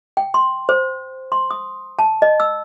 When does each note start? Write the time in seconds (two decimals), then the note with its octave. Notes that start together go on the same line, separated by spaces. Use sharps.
0.17 G5
0.34 C6
0.69 C5
1.32 C6
1.51 D#6
1.99 A5
2.22 D#5
2.40 E6